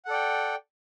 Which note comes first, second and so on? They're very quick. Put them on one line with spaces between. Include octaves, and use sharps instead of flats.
F#5 A4 D5 G5